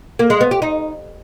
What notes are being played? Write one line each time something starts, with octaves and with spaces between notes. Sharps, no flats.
A#3
G#3
B3
G4
D#4